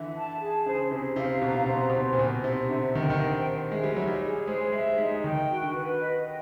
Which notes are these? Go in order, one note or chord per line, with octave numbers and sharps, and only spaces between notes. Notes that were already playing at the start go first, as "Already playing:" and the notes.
Already playing: D3 E3 E5
A5
G#4
C#3 C5
C3 C5
C3 F5
B2 A#5
C3
B2 C5
C3
B2 C5
A#2
B2 C5
C3 C5
D3 E5
D#3 G5
D3
D#3
C5
C5
G#3 E5
G3
F#3 D#4
G3
G#4
G#3 C5
G#3 E5
G#3 D#4
D#3 G5
F#4
D3
B4
D#5
G5